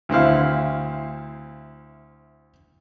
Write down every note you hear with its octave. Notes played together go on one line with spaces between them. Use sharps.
D2 C4 E4 F5